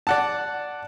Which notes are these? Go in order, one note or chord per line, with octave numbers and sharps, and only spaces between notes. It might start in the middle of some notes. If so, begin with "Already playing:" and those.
D5 F#5 A5